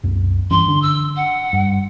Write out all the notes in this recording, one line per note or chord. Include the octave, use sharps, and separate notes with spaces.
C2 F#2
G2 E3 C#4 C6
D3 D4
E6
F#5
G2